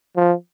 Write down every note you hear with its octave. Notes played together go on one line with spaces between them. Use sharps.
F3